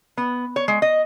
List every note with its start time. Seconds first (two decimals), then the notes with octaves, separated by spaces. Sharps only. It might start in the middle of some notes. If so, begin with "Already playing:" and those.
0.17 B3
0.56 C#5
0.68 G#3
0.82 D#5